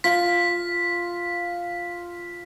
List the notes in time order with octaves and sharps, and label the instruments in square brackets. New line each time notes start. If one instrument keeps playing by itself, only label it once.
[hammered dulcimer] F4 [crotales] B6